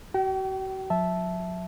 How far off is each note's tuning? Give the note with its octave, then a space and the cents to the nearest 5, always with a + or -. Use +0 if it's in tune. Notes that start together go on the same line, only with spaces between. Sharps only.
F#4 +40 G5 -35
F#3 -40 E5 +0 A5 -10